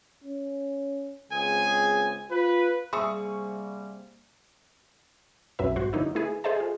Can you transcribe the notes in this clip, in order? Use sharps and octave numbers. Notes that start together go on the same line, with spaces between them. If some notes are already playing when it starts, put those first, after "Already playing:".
C#4
C#2 C4 G#4 G#5
F4 B4
C3 G3 A#3 G#4 E5 C#6 D#6 E6
B1 F#2 F#3 B4 E5
G#1 F#4 C5
D3 F#3 A#3 D#4 E4
A3 E4 G#4 B4
G#4 A4 C5 D#5 E5 A5
F4 G#4